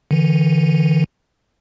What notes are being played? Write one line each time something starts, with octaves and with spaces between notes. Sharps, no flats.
D3 E3